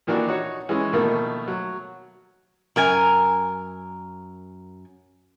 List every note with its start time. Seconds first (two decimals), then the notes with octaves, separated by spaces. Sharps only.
0.07 A#2 D#3 E3 D4 F#4
0.27 D#4 F#4 C#5
0.69 E3 G#3 C#4
0.93 B2 D#3 F3 A3 A#3
1.48 F#3
2.76 F#2 A#4 G#5